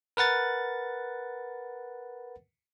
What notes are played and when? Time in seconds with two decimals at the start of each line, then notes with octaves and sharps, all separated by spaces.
0.17 A#4 B4 F#5 A6